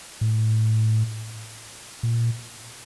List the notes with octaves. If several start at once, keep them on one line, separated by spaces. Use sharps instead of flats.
A2
A#2